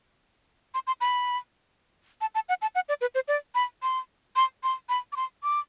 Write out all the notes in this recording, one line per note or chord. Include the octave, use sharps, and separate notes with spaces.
C6
C6
B5
A5
A5
F#5
A5
F#5
D5
B4
C5
D5
B5
C6
C6
C6
B5
D6
C6
D6